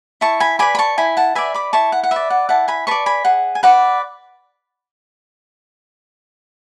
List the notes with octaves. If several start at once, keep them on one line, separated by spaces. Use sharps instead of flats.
E4 A5 C#6
G#5 B5
B4 D5 G#5 B5
B5
A5 C#6
E4 G#5 B5
F#5 A5
B4 D5 E5 G#5
B5 D6
E4 A5 C#6
F#5
F#5
B4 D5 E5
F#5
E4 F#5 A5
G#5 B5
B4 D5 A5 C#6
G#5 B5
G#4 F#5
G#5
B4 D5 F#5